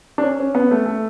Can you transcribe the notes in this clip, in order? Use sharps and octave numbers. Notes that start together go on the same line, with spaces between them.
D4
C#4
C#4
B3
A3
A3